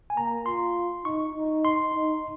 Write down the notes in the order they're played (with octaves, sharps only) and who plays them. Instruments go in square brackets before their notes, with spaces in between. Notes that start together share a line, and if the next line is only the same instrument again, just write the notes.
[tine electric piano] G#5
[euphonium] A#3 [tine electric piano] A#5
[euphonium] F4 [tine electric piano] C6
[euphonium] D#4 [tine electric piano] C#6
[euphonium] D#4
[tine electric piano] C6
[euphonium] D#4